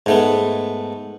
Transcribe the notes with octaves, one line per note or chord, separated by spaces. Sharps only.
G#2 A3 B3